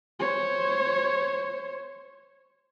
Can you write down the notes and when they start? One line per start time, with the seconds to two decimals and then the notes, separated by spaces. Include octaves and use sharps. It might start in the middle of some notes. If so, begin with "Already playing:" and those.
0.20 C5 C#5